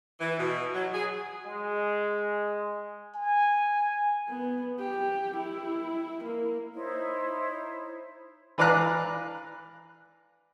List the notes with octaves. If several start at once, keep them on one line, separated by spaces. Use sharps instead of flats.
E3
B2
F#3
G#4
G#3
G#5
B3
G4
E4
A#3
D#4 E4 C5 C#5
E3 B4 D5 F5 A#5 F#6